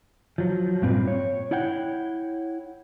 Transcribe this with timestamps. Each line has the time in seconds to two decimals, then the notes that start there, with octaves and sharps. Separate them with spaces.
0.38 F3 F#3
0.82 G2 A#2 C4 F4 B4
1.07 C#5
1.51 E4 C#5 F#5 G5